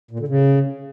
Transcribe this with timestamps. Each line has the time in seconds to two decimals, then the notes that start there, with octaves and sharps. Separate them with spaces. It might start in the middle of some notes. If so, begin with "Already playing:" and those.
0.11 A#2
0.19 D3
0.28 C#3